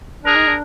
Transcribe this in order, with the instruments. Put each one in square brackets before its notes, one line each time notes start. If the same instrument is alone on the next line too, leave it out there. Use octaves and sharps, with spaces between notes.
[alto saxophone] D4 [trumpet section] G#4 A#4
[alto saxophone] D#4
D4